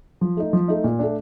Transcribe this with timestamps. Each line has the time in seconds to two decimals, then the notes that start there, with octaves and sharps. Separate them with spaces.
0.21 F3
0.37 A3 D#4
0.53 F3
0.68 A3 D#4
0.84 A#2
0.99 A3 D4